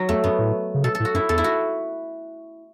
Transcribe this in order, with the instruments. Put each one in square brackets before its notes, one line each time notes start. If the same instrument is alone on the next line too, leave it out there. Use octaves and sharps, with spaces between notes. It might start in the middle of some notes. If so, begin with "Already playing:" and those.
Already playing: [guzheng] F#3
[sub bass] E2 [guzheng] A3
[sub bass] F#2 [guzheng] B3
[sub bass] A2
C#3
[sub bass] B2 [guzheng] A4
[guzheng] A4
[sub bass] A2
[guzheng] F#4
[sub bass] F#2 [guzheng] E4
[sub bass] E2 [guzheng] A4
[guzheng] E4
F#4